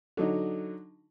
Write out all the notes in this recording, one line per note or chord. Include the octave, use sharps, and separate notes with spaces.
D3 F#3 D#4